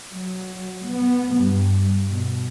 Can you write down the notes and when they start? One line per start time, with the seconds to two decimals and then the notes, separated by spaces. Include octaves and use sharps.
0.12 F#3
0.86 B3
1.35 G2
2.11 B2